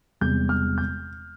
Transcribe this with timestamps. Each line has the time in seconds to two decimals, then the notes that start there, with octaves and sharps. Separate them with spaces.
0.21 E1 E2 C3 G3 G6
0.49 F6
0.78 G6